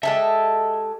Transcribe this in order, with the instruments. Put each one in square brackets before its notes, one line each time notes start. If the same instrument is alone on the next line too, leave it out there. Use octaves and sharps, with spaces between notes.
[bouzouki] G#3 G4 A4 [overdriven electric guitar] E5